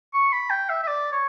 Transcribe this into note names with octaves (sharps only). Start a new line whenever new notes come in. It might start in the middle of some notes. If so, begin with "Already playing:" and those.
C#6
B5
G5
E5
E5
D5
C#5